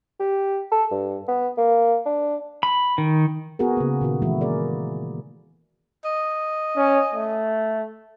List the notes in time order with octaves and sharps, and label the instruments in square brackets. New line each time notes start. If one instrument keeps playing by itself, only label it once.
[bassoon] G4
A4
G2
B3
A#3
D4
[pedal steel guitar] B5
D#3
[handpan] B3 F#4 G#4 A#4
C#3 A#3
A#2 D#3 F#4
E3 G#3 A3 E4 F#4
A#3 G#4 A#4 B4 D5
[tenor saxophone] D#5
[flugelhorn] C#4
A3